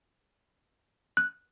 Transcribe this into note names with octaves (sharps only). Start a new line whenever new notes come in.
F#6